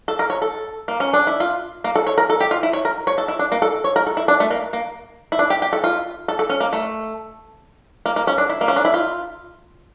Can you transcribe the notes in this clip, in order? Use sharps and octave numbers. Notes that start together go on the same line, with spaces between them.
A4
A#4
C#5
A4
A#3
C#4
D4
E4
F4
A#3
A4
C#5
A#4
A4
G4
F4
E4
C#5
A#4
C#5
A4
E4
D4
A#3
A4
C#5
A#4
A4
E4
D4
A3
A#3
A#3
E4
D4
G4
G4
A4
F4
A4
A4
C#4
A#3
A3
A#3
A#3
C#4
D4
E4
A#3
C#4
D4
E4
F4